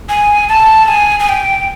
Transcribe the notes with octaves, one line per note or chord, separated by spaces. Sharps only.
G#5
A5
G#5
G#5
G5